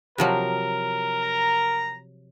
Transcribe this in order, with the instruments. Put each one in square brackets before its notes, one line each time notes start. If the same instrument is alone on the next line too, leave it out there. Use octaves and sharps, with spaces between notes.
[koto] C3 F3 F#3 [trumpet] A#4
[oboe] A#5